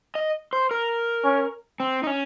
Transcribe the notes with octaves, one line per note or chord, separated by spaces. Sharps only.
D#5
C5
A#4
C#4
C4
D#4
C#4